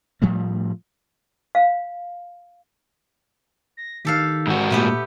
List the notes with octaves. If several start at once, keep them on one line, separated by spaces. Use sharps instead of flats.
A2 F3 G3 A3
F5
A#6
D#3 G4 A4 F5
G#2 F#4
A#2 A3 B3 G4